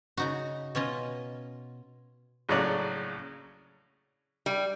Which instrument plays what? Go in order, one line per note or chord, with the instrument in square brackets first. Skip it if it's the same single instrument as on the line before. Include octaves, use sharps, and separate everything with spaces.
[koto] C#3 D#4 F#4
B2 C#4 F4 D#5
[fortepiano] A#1 A2 C#3 F#3 C#5 D5
[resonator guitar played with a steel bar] G3